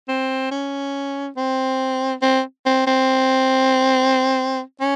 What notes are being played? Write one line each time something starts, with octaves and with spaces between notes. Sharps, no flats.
C4
C#4
C4
C4
C4
C4
C#4